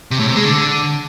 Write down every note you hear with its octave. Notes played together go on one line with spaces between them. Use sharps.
C3
A2
C3
G#3
D3